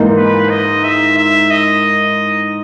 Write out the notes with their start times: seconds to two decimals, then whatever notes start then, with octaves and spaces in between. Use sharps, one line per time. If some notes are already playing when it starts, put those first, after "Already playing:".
Already playing: G#2 E3 A#3 D#4
0.17 B4
0.50 D#5
0.84 E5
1.18 E5
1.51 D#5